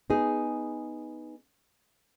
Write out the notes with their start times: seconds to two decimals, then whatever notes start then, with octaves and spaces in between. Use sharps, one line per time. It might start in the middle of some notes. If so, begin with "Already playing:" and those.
0.10 B3 D#4 G#4